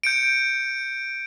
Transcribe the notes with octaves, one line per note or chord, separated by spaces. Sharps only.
G6 C#7 D7